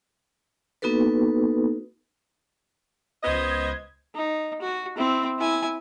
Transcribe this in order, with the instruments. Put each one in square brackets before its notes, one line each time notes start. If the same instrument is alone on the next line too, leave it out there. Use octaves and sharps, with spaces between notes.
[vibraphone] A#3 B3 D#4 F#4 A4 B4
[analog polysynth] C#2 G#6 [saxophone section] B3 C5 D#5
[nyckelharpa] D#4
F#4
C4 E4
E4 G#5